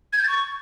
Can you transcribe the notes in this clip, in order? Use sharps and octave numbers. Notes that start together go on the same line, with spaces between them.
G#6
G6
A6
C#6